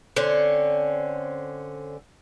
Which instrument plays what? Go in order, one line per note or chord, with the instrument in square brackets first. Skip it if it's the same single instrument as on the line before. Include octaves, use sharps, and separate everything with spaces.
[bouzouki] D3 C4 C#4